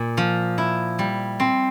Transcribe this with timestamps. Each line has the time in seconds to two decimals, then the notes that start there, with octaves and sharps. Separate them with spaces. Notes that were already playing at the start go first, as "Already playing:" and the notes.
Already playing: A#2
0.17 F3
0.58 E4
0.99 G3
1.40 C4